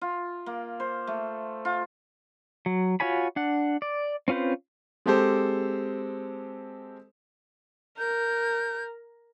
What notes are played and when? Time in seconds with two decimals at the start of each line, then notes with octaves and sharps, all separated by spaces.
0.01 F4
0.46 A#3
0.80 C5
1.07 A3
1.65 F4
2.66 F#3
3.00 F4 F#4 C#5 G#5 B5
3.36 D4 F#5
3.82 D5
4.28 C4 C#4 F4 B4 C5
5.06 G#3 C4 G4 A4 C5
7.98 A#4 G6